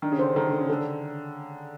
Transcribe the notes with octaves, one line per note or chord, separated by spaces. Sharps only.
D#3 D4
C#3
D3 C5
D#3 A4
D3 A4
C#3
D3 A4